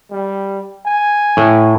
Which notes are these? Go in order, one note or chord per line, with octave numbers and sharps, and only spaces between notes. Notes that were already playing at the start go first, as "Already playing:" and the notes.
G3
G#5
A2